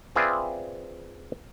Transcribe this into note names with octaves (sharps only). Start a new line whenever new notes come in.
C4 F4 G#4 B4 D5 E5